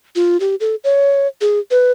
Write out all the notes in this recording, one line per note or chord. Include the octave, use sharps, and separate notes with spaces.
F4
G4
A4
C#5
G#4
B4